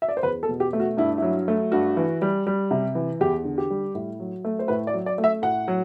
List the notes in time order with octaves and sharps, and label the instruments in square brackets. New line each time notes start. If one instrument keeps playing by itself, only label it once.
[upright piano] E5
D5
C5
E2 B4
A4
B2
G4
A3
F#4
G2 E4
F#3 E4
A3
G2 F#4
E3
G3
G3
C3
E3
E2 G4
D3
G4
G3
A2
F#3
A3
C5
A2 B4
D5
F#3
D5
A3
E5
A2 F#5
F#3